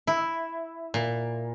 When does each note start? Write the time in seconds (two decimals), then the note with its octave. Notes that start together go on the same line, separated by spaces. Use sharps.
0.07 E4
0.94 A#2